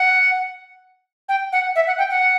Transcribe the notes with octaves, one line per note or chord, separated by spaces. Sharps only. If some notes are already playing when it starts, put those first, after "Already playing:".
Already playing: F#5
G5
F#5
E5
F#5
G5
F#5